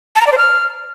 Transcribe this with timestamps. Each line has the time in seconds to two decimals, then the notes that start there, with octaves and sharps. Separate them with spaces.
0.16 A5
0.21 A#5
0.27 D5
0.32 C5
0.38 F6